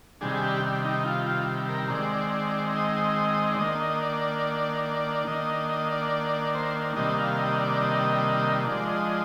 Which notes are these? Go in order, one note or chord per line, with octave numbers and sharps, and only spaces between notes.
C3 D#3 G3 D4 G#4
G4
D4
D#4
F4
F4
A#4
D#3 G#3 C4 D5
D#5
D5
D#3 A#3 D4 D#5
D#5
D5
D5
D#3 A#3 D4 D#5
D#5
D5
C5
C3 D#3 G3 A#3 D4 D#5
F5
D#5
D5
D#5
F3 G#3 D4 D5
D#5